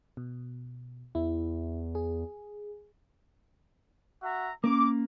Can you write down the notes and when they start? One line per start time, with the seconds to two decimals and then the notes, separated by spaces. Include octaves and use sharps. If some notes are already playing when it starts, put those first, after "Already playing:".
0.17 B2
1.15 E2 E4
1.95 G#4
4.23 F#4 E5 A#5
4.64 A#3 C#4 D6